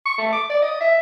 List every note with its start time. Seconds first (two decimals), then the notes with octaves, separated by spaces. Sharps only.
0.05 C#6
0.18 A3
0.33 D6
0.50 D5
0.62 D#5
0.81 E5